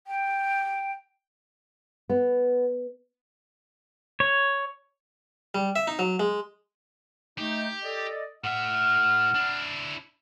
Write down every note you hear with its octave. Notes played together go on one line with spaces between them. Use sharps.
G5
B3
C#5
G3
E5
D#4
F#3
G#3
A3 D#4 G4
A4 D5 D#5
A2 E5 F#5 F6
D4 E4